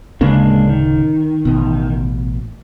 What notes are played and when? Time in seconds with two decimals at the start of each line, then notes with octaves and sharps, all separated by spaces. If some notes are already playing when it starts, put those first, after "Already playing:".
0.21 D1 C#3 G#3 A#3 C#4 D4
0.69 D#3
1.45 A1 B2